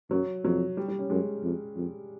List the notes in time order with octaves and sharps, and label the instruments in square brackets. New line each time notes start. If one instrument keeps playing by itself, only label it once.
[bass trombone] F#2 [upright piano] F#3
[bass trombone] F2 [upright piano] F#3
[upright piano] G3
G3
C#4
[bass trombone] F#2 [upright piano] G#3
[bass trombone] F2
F2